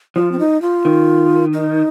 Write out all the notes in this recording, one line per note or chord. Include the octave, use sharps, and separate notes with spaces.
F3 F4
C4
D#4
F4
D#3
D#4